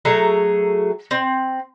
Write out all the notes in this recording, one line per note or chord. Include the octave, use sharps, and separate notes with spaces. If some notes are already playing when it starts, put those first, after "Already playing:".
F#3 A3 G#4 A#5
C4